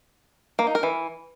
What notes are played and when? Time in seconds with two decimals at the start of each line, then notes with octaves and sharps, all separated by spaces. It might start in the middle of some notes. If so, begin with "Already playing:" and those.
0.59 A#3
0.67 D#4
0.75 A#4
0.83 E3